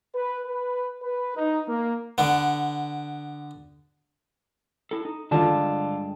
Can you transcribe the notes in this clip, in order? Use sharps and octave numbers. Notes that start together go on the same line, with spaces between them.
B4
B4
B4
D#4
A#3
D3 B3
E4 A4
D#4
G2 D3 G#3 F4 A5